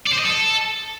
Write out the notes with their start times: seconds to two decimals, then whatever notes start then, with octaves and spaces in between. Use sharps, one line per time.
0.07 D5
0.13 C5
0.19 D#5
0.25 A4